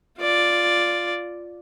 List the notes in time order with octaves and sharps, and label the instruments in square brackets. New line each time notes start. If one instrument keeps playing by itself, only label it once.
[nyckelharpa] F4 D5